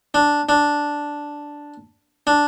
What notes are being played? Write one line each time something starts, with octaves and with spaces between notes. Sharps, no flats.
D4
D4
D4